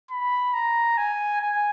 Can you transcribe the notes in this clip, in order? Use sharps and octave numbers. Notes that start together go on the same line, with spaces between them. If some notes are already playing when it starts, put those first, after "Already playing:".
B5
A#5
G#5
G#5